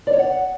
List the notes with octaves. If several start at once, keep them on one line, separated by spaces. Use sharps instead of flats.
D5
C#5
F#5